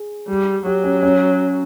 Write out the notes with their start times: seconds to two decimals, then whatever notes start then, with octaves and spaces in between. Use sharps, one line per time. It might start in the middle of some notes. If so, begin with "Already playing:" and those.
Already playing: G#4
0.28 G3
0.66 F#3 G4
0.84 C#4
1.03 C#4